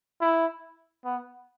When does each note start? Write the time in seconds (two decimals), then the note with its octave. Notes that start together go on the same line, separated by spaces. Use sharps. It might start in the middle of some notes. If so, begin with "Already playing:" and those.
0.21 E4
1.05 B3